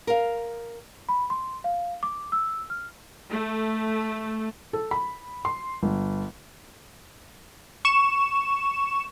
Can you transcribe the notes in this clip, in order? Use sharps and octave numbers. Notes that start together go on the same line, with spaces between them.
A#4 F5
B5
C6
F5
D6
E6
F6
A3
A4
B5
C6
G1
C#6 E7